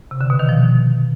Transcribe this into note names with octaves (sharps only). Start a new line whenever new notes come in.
C3
D3
B2
D#3
F3